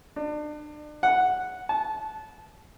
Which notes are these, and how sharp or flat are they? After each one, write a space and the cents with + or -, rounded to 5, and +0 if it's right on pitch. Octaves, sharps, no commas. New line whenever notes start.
D4 +35
F#5 -5
A5 -25